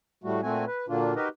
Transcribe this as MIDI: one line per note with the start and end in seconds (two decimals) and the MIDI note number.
0.24 0.41 45
0.24 0.41 55
0.24 0.41 57
0.24 0.41 66
0.43 0.65 46
0.43 0.65 57
0.43 0.65 60
0.43 0.65 66
0.43 0.65 80
0.67 0.86 71
0.88 1.14 46
0.88 1.14 50
0.88 1.14 54
0.88 1.14 58
0.88 1.14 62
0.88 1.14 65
1.16 1.28 63
1.16 1.28 66
1.16 1.28 67
1.16 1.28 70
1.16 1.28 71
1.16 1.28 75